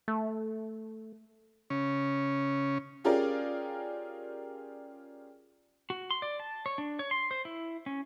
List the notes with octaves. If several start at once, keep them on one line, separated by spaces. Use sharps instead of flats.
A3
C#3 C#4
C#4 F4 G4 G#4 A#4 D5
F#4
C6
D5
A5
C#5
D4
C#5
C6
C5
E4
C#4